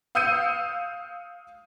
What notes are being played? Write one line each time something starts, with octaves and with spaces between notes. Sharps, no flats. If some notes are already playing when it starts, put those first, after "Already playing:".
F5 D#6 E6 G6 C#7 D#7